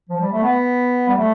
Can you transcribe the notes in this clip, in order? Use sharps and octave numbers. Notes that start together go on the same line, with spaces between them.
F3
G3
A3
B3
G3
A3